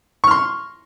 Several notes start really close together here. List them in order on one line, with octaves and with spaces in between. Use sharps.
C#6 F6 C6